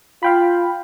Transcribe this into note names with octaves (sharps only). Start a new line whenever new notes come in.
F4 F5 G5 B5